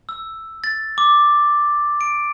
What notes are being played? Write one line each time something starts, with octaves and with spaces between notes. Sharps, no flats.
E6
A6
D6
D7